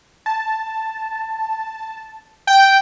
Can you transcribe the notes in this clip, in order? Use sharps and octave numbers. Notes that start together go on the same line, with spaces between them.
A5
G5